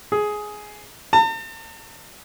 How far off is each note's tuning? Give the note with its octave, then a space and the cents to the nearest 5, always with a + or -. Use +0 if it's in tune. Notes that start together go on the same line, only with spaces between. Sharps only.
G#4 +10
A5 +45